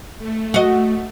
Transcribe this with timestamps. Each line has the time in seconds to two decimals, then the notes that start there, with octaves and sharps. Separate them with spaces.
0.19 A3
0.54 F#4 D#5